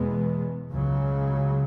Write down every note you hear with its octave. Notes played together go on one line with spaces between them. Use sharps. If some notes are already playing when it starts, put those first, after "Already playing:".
Already playing: E2 B2 G#3 B3
C#2 C#3 F#3